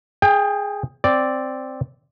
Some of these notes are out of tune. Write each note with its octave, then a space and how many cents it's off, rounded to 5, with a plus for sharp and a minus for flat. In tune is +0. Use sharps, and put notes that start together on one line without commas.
G#4 +0 G5 +25
C4 +0 D5 +0